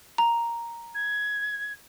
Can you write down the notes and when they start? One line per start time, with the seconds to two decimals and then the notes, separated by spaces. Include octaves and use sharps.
0.18 A#5
0.94 G#6